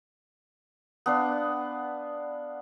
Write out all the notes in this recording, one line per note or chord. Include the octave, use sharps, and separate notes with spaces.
B3 D4 F5